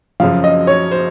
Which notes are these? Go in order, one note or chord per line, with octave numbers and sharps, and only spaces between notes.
F#2 C#3 F3 F5
D#5
C#5
C5